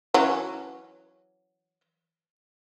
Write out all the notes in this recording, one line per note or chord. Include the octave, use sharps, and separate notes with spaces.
E3 F#3 C#4